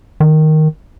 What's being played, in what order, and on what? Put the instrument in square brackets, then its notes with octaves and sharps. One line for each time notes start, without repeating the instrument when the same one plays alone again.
[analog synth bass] D#3